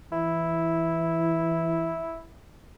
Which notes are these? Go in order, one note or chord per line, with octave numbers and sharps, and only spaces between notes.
E3 E4